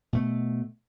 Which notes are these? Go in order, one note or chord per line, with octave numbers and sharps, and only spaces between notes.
B2 A3